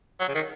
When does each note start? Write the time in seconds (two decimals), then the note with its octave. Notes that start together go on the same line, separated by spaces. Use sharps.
0.20 F#3
0.28 C#3
0.35 D#3